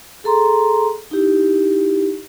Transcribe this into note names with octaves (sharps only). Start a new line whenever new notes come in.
G#4 A4 A#5 C6
D#4 E4 G4